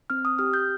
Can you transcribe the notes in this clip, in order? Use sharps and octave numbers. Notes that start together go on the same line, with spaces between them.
C4 F6
D#6
G4 F6
G6